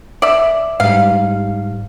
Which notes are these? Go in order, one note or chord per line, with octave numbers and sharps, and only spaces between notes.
D5 E5
G#2 G3 F5